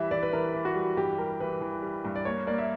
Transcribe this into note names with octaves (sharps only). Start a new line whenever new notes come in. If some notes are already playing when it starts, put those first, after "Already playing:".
Already playing: E3 G3 E5
E3 D5
B4
E3 A#4
E3
F#4
G3
G2 G4
G3 A#4
E3 B4
E3
G3
G2
D5
A#3 C#5
A#3 D5
E5